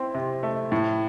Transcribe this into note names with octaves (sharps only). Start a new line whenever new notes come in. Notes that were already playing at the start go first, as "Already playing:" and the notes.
Already playing: C4 E4
C3
A3
A2